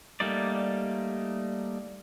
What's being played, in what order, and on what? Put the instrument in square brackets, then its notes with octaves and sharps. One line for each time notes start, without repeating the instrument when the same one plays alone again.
[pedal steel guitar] G3 A3 A#3 D#4 D5